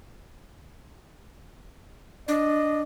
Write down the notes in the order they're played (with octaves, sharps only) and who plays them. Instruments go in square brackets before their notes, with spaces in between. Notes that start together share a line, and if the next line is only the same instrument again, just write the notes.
[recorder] D4 [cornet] D#5